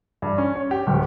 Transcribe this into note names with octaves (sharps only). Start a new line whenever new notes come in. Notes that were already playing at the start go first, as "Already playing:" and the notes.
G2
C#4
C#5
G4
D1